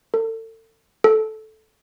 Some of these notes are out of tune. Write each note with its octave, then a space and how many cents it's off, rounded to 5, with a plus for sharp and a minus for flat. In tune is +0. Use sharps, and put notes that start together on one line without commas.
A4 +35
A4 -10